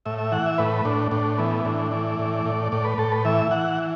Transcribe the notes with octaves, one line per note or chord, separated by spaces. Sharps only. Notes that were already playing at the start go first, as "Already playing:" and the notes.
A2 E5
E5
E3 F#5
E5
A2 B4
A2 D4
A2 D4
E3 B3
A2 D4
E3 D5
A2
A2
A2 D5
B4
A2 A4
B4
E3 E5
E3 F#5